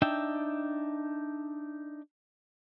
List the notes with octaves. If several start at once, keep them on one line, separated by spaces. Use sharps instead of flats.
D4 D#4 E5 G5